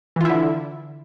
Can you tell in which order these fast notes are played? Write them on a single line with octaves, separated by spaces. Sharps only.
E3 F4 E4 D3